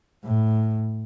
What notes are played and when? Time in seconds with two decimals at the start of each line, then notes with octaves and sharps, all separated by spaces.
0.24 A2